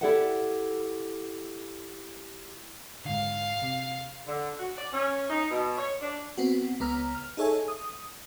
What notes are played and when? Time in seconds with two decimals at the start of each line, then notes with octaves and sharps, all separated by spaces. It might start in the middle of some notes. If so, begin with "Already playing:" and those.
0.01 E4 G4 A4 D5 E5 F#5
3.05 G#2 D3 F5
3.62 C3
4.27 D3
4.59 F#4
4.77 D5
4.92 C#4
5.29 D#4
5.51 B2
5.77 C#5
6.00 D4
6.38 B3 C4 F#4
6.80 C#2 B3 A#5 F6
7.15 F6
7.37 D#4 G#4 A4 C#5 E5 G#5
7.68 D#6